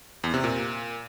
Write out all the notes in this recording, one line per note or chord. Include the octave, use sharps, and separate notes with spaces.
E2
C3
A#2